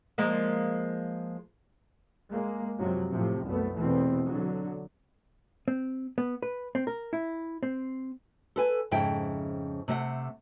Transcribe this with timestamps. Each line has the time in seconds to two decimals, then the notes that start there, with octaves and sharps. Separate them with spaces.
0.18 F3 G#3 A#3
2.30 G#3 A#3
2.78 F#2 C3 F3 F#3
3.10 A2 C3 F3
3.46 C2 F#2 A3 B3
3.76 E2 B2 E3 A3 C4
4.26 D3 F#3
5.68 C4
6.18 B3
6.42 B4
6.75 C4
6.87 A#4
7.13 E4
7.63 C4
8.56 A4 B4 G#5
8.91 F2 G#2 C#3 E4 G5
9.88 C3 A3 D#5 F#5